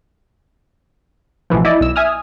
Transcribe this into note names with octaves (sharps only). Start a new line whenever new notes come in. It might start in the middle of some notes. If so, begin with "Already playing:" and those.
A1 B2 E3 F3
E4 D5 D#5
B1 E6
E5 G#5 D#6 F6